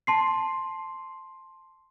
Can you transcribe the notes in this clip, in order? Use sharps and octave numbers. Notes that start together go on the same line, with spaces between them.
A5 C6 C7